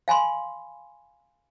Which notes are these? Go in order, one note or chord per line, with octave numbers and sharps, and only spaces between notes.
F5 G#5 B5 C6